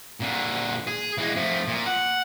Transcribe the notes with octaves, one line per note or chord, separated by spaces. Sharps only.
A#2 D3
G#4
E3 G#3
F3 A3
A#2
F#5